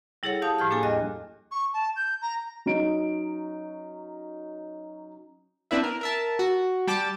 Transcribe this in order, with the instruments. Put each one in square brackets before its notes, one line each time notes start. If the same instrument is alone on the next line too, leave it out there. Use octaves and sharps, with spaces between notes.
[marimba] G3 E4 G#4 A4 C#5 F#5
G4 F5 A5 D#6
A2 F3 F6 G6
A#3 D4 G#4 A4 G#5
E2 G3 D#5 F#6
[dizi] C#6
A5
G6
A#5
[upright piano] F#3 C#4 D#4 D7
[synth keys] B3 C4 D4 E4 B4 E5
A#4
A#4 E5 A5
F#4
G3 G5 A5 D6